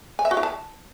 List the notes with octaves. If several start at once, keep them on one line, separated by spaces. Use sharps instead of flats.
G#5
E5
F#4
E4
A5